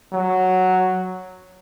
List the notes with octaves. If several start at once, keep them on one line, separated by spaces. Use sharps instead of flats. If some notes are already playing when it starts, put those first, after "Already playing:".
F#3